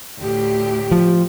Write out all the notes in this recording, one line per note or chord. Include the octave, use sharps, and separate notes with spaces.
D2 A2 G4
F3